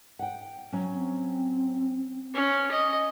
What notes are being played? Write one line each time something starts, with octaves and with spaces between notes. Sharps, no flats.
F#5 G5
F#3 C#4
C4
C#4
D#5